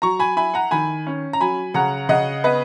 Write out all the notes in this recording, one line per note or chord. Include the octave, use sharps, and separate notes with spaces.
F#3 A#5 C#6
G#5 B5
E4 G#5 B5
F#5 A#5
D#3 G#5 B5
C#4
A#5
F#3 G#5 B5
C#3 F#5 A#5
C#3 D#5 F#5
B3 B4 D#5